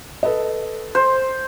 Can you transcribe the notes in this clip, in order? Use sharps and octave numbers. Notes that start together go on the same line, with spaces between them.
A4 B4 D#5
C5